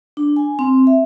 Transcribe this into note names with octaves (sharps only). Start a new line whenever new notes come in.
D4
G#5
C4
E5